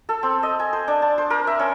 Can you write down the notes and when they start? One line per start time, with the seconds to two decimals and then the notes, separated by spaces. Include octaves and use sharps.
0.09 A4
0.23 C4
0.43 D#5
0.60 G#5
0.73 C5
0.88 D4
1.02 A5
1.18 C5
1.30 A#4
1.47 E5
1.59 C#4